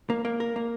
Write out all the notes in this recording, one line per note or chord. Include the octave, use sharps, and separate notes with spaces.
A#3
A#3
A#4
A#3